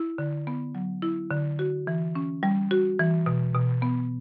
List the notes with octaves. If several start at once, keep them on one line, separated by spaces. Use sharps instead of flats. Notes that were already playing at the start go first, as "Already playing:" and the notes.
Already playing: E4
D3
B3
F#3
E4
D3
F#4
E3
C#4
G3
F#4
E3
B2
B2
B3